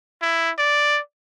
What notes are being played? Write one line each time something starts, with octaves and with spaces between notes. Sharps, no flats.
E4
D5